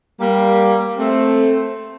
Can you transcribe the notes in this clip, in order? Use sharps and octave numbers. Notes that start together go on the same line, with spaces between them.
G3 A#3
A3 C4